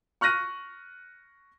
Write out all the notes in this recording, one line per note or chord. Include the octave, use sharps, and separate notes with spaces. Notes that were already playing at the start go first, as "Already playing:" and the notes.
C#6 F6 F#6 A#6 D#7